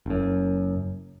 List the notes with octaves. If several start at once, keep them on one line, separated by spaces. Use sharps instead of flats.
F#1 F#2